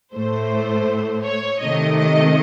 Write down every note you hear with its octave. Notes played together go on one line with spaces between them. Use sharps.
A2 A3 C5
C#5
C3 D#3 A3 D#5
D#5